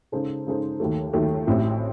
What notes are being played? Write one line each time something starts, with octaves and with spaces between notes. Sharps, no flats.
C#3 G#3 D#4 A4 C5
C#3 G#3 D#4 A4 C5
D#2 D#3 F#3 A3
D#2 D#3 F#3 A3
A1 A2 F#3 C4 E4